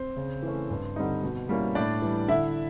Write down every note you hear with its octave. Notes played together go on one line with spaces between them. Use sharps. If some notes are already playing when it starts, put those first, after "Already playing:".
Already playing: C4 C5
C#3
E3 A3 C#4
G2
D3 G3 C4 D#4
B2
G3 A#3 C#4 E4
A2 D4 D5
E3 G3
D3 E4 E5